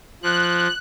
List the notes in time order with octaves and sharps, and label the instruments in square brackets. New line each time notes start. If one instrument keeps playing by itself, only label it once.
[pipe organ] F3 [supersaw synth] F#6